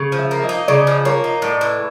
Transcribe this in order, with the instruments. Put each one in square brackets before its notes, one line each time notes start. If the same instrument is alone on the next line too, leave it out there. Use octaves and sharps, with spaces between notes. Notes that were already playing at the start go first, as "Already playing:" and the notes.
Already playing: [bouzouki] C#3
F3
[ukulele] E5
[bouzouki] A#3
[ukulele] D#5
[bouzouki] D#4
[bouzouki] C#3 [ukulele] D5
[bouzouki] F3
[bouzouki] A#3 [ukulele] C#5
[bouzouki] D#4
[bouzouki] A2 [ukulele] D5
[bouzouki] E3